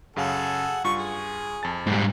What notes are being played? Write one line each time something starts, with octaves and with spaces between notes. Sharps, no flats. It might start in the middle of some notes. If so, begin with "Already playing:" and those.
F#2 C#3 G#4 A4 F5 F#5
G2 F4 C#6
G#4
F2 A5 A6
G#2 G3